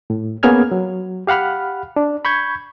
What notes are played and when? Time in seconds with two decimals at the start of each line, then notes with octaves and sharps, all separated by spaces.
0.10 A2
0.43 A#3 B3 C#4 G#4 F6 G#6
0.72 F#3
1.27 G4 F5 F#5 B5 F6
1.96 D4
2.25 B5 C#6 G6 G#6